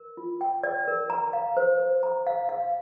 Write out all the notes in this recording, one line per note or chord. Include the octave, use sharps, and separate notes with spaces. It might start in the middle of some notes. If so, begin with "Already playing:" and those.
Already playing: A#4
F4
G5
D5
A#4
A#5
F5
C5
C5
A#5
F5
F5